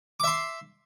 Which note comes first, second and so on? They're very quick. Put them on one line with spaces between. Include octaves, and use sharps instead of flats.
D6 E5 C6